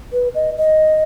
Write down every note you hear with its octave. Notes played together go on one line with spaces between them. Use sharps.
B4
D#5
D#5